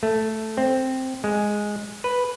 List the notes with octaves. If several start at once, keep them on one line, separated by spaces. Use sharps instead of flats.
A3
C4
G#3
B4